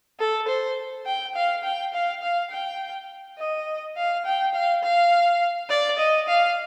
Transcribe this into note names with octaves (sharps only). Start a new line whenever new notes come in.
A4
C5
G5
F5
G5
F5
F5
G5
D#5
F5
G5
F5
F5
D5
D#5
F5